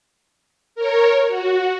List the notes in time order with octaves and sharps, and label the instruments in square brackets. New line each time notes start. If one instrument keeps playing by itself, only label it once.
[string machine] A#4 C#5
F#4